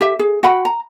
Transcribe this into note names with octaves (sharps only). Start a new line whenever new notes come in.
G4 E5
G#4
F#4 F#5 G5 B5
A#5